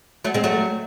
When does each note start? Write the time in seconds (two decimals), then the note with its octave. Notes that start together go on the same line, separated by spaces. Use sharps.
0.24 F#3 A3
0.34 G#3 C4
0.44 F#3 A3